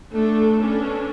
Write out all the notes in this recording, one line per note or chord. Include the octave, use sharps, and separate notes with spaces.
A3 D4 A4
B3 C#4 D4 A4